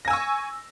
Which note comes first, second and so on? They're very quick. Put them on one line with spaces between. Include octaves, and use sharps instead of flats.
A#6 G#5 E6 C#6